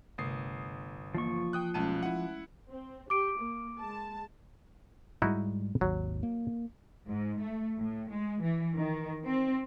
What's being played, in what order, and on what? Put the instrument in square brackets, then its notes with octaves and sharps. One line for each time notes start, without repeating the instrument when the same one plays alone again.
[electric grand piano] G1 D#6 C7 [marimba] C3 A3
[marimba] E3 A#3 [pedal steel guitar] F3 C#6
[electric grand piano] G5 D#6 F#6
[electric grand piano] B1 A5 D#7 [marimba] G#3 A3 C#4
[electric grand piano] E4 F#5
[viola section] C4
[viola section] G4 [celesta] D6 D7
[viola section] A#3
G#3 A5
[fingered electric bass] G#2 G3 G#3 [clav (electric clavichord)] D#4 E4 F#4
[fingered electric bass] G#1 D#2 [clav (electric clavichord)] F#3
[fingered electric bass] A#3
[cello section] G#2
A3
A2
G#3
E3
D#3
C4